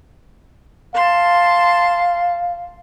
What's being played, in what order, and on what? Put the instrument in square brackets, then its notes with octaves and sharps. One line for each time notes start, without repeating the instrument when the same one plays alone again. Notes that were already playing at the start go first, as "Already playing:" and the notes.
[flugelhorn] F5 [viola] A5 C6